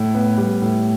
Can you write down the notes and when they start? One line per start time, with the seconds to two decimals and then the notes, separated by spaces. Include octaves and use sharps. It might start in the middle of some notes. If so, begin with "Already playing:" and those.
Already playing: A2
0.14 B3
0.37 G3
0.62 A2